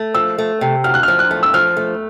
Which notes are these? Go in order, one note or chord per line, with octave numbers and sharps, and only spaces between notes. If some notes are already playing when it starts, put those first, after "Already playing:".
Already playing: A3
F3 E6
A3
C3
D2 F6
F#6
F3 F6
F#6
A3
E6
F3 F6
A3